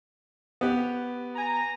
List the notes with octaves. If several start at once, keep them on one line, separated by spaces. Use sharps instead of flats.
B3 G4
G#5 A#5